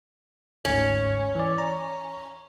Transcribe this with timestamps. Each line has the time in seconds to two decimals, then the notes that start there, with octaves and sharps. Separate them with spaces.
0.65 G1 D2 G#2 C#4
1.35 E3 D5
1.58 A#5